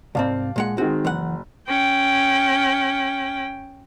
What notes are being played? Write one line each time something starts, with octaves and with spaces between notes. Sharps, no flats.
C2 G#2 C4 D5 F5 A5
A#2 G#3 F#5
D#3 G#3 C4 F#4
F#1 E3 F#5
C#4 G5